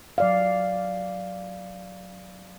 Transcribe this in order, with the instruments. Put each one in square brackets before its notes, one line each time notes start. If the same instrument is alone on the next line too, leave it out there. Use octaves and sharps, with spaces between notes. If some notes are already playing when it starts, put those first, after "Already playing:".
[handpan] F#3 D5 F5